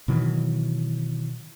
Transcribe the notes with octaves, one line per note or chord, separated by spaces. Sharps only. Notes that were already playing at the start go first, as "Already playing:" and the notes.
B2 D#3 E3 F#3